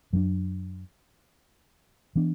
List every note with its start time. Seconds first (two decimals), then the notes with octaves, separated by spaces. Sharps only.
0.13 F#2 F#3 B3 D4
2.15 E3 B3 D4